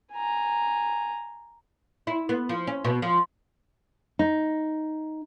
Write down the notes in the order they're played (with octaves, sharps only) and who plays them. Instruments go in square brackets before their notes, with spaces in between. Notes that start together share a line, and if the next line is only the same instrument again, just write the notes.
[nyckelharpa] G#5 A#5
[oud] E4
B3
F3
C#4
B2
F3
[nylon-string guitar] D#4